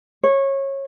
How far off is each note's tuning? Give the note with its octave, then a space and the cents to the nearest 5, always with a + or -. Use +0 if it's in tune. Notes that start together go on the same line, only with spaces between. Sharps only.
C#5 -20